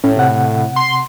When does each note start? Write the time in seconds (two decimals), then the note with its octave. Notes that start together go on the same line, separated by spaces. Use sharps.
0.04 A2 C#4
0.17 C3 F#5
0.76 C6